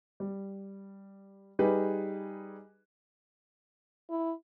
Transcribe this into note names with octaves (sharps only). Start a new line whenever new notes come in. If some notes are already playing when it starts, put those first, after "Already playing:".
G3
G3 D#4 G4 G#4 B4
E4